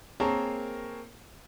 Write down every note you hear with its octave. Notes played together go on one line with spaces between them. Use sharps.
A#3 C4 G#4 A#4 C#5 A5